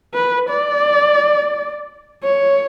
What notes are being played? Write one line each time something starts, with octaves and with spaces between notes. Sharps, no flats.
B4
D5
C#5